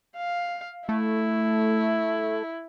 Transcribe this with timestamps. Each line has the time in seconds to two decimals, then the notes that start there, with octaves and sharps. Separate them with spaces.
0.17 F5
0.89 A3 E4